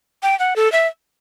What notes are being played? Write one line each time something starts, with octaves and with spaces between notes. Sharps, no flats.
G5
F#5
A4
E5